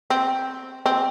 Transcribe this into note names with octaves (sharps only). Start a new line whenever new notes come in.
C4
C4